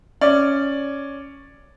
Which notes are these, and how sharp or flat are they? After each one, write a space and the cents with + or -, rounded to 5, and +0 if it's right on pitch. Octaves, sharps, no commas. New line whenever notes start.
C#4 +0 D5 +0